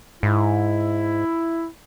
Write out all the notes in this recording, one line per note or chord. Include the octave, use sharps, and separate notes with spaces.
G#2 E4